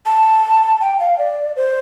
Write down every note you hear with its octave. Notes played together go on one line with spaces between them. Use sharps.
A5
G5
F5
D5
C5